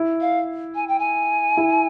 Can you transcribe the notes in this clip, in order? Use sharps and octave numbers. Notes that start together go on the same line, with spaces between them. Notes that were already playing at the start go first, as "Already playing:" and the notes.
Already playing: E4
F5
G#5
G5
G#5
E4